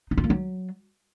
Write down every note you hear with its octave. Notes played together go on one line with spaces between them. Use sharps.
D#4
F4
A#3
F#3